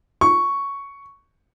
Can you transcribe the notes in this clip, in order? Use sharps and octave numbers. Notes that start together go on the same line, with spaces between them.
C#6